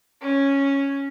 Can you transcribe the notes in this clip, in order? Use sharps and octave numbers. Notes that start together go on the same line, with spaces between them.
C#4